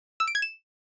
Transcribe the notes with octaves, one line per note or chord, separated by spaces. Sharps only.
E6
D7
G#6
E7